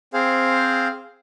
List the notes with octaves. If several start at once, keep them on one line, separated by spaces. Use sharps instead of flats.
C4 G#4 C5 F5